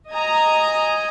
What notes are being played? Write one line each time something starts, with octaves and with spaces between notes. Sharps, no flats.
D#5 G#5 A#5